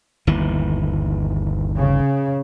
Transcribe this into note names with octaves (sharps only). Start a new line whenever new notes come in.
G1 D#2 E3
C#3